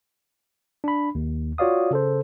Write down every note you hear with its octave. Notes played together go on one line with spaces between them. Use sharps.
D4 B5
D#2
F4 F#4 C#5 D5 F5 D#6
C#3 A4 C5